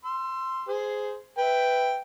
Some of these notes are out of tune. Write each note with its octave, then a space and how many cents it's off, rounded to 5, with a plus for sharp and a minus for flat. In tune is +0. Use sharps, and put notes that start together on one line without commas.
C6 +0 E6 +25
G#4 +5 C5 -15
B4 +10 E5 +0 G5 +0